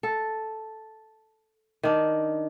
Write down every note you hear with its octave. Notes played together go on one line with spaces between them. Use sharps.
A4
D#3 D4